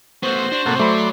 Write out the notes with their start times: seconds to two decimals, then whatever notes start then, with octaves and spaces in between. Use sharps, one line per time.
0.23 A3 B3 F#4 C5
0.52 D4
0.66 A2 C3 A#3 A4 F#5
0.80 F#3 A3 D5 B5 C6 C#7